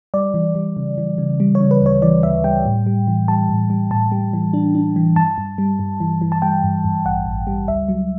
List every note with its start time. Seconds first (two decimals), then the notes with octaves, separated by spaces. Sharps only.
0.14 G3 D5
0.34 E3
0.55 G3
0.77 C#3
0.98 E3
1.18 C#3
1.40 G3
1.55 C#5
1.61 C#3
1.71 B4
1.81 D2 C#5
2.02 E3 D5
2.23 D2 E5
2.44 G3 G5
2.65 A2
2.86 G3
3.07 E3
3.28 G3 A5
3.49 A2
3.70 G3
3.91 A2 A5
4.12 G3
4.33 E3
4.53 D4
4.75 D4
4.96 E3
5.16 G2 A5
5.38 G2
5.58 G3
5.79 G2
6.00 E3
6.21 E3
6.32 A5
6.42 G3 G5
6.64 G2
6.84 G2
7.05 A1 F#5
7.26 A1
7.47 G3
7.68 C#2 E5
7.89 F#3